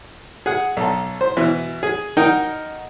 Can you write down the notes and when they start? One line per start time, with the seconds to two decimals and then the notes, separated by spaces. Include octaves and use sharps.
0.46 G#4 F#5
0.77 B1 A4
1.21 C5
1.37 B2 E3
1.83 G#4
2.17 D#4 F#4 A#4 D#5 G5